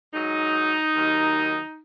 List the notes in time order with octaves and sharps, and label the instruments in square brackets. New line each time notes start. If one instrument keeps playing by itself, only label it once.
[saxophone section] G#2 F#3 D#4
D#2 D#3 F#3